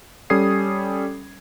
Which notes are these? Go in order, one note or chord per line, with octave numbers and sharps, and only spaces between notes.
G3 C#4 A4 D#6 G#6 C7